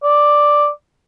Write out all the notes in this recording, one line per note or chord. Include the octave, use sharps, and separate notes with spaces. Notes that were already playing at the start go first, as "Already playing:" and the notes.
D5